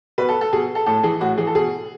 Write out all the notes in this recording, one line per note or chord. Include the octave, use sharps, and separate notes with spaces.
B2 B4
A4
A4
B2 G#4
A4
A2 A4
E3 G#4
A2 F#4
E3 G#4
A4
B2 G#4